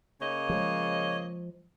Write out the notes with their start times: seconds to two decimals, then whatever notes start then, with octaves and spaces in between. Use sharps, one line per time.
0.21 C#3 A#3 C#5 D#5
0.50 F3 G#3